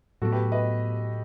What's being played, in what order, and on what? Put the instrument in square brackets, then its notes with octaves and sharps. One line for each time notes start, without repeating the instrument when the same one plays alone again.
[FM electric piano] A2 F#3 B3 [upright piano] F#4 A4
[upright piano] G4 B4
B4 D#5